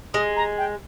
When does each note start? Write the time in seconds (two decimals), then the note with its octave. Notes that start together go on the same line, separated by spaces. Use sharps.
0.14 G#3 D#6
0.36 A#5
0.58 G5